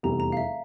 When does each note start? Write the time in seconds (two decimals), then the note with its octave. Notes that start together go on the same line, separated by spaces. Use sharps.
0.03 F1 E2 C3 E3 G3 A#5
0.20 A#5
0.32 F5
0.37 E5